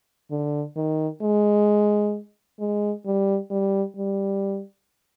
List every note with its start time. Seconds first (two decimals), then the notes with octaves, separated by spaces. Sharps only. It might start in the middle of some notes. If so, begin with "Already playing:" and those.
0.31 D3
0.76 D#3
1.22 G#3
2.60 G#3
3.05 G3
3.50 G3
3.97 G3